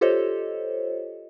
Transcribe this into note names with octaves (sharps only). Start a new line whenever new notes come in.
F4 G4 A4 C5 C#5 D#5